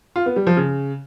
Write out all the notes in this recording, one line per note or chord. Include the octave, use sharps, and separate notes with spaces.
F4
B3
G3
F3
C#3